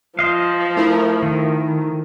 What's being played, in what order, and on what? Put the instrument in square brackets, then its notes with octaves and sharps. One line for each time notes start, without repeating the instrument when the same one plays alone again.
[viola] F3 [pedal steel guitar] C5 D#5 F5
[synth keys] A3 E4 A#4
[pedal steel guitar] D#3